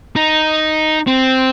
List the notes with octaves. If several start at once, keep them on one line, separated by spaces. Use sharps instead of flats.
D#4
C4